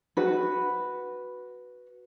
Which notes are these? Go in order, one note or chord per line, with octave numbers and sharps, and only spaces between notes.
F#4 B4